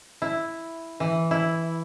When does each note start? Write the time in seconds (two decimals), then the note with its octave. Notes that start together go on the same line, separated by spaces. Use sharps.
0.22 E4
1.00 E3
1.31 E4